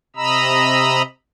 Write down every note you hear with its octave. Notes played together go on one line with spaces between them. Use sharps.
C3 D#5 A#5 B5 E6